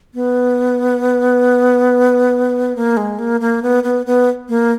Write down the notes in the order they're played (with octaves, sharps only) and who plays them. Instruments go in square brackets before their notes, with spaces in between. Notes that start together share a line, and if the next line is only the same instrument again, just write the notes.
[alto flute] B3
A#3
G#3
A#3
A#3
B3
B3
B3
A#3